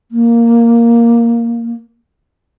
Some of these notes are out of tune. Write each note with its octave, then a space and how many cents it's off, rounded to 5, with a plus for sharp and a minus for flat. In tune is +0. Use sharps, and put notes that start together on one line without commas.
A#3 +0